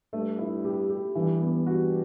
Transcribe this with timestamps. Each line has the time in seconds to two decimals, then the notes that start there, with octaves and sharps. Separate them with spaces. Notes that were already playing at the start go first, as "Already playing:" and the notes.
0.13 G2 A3
0.39 E4
0.64 G4
0.90 G4
1.15 G2 E3
1.41 B3
1.67 G2 F#4